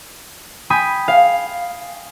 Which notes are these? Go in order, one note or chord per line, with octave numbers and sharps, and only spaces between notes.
G5 G#5 B5 D#6
F5